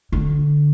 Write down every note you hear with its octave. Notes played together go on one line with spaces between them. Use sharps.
D3